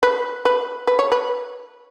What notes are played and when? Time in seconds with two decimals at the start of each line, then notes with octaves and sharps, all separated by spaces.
0.03 B4
0.45 B4
0.87 B4
0.99 C#5
1.12 B4